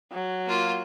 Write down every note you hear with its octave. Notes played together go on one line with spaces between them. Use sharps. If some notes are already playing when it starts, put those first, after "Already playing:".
F#3
A#3 F4